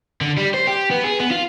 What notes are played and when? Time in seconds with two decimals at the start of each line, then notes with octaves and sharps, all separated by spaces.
0.21 D3
0.37 G3
0.54 C5
0.67 G4
0.91 B3
1.05 G#4
1.20 B3
1.31 F4